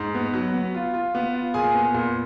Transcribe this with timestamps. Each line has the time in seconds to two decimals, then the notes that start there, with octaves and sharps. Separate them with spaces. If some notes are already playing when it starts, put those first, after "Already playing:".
Already playing: G#2
0.15 B3
0.34 F#3
0.54 B3
0.75 F4
0.94 F4
1.15 B3
1.34 F4
1.54 A#2 G#4 G#5
1.74 B3
1.94 A#2